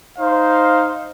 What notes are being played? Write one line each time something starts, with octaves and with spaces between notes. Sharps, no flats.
D#4 C5 F5